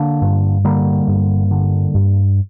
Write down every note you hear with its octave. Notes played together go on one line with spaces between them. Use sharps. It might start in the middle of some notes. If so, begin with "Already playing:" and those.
Already playing: D3 A#3 D4
G2
D3 G3 A#3
G2
D3
G2